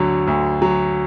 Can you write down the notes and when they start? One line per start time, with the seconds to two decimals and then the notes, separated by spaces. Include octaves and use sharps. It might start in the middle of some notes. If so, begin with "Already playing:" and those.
Already playing: D2 D3 F#3
0.27 D2
0.62 F#3